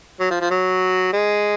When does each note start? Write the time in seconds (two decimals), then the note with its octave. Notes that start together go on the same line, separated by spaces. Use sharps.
0.20 F#3
0.30 F3
0.41 F3
0.51 F#3
1.13 G#3